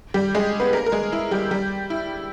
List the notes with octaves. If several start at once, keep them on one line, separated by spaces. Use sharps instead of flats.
G3 G4
G#3 G#4
B3 B4
A#3 A#4
A#4
G#3 G#4
E4
G3 G4
G3 G4
E4